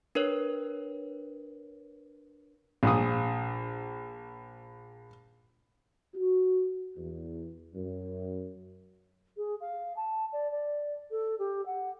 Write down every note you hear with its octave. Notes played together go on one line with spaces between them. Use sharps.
D4 A#4 B4 C#5
A#1 D#6
F#4
E2
F#2
G#4
F5
A5
D5
D5
A4
G4
F#5